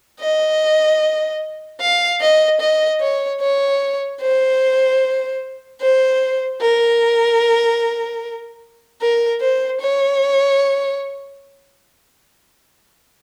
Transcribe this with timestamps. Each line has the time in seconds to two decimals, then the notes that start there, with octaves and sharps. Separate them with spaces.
0.21 D#5
1.81 F5
2.21 D#5
2.61 D#5
3.01 C#5
3.41 C#5
4.21 C5
5.81 C5
6.61 A#4
9.01 A#4
9.42 C5
9.81 C#5